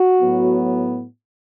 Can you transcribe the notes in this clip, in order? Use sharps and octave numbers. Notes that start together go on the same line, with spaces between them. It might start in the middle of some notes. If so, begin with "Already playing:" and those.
Already playing: F#4
A2 F#3 B3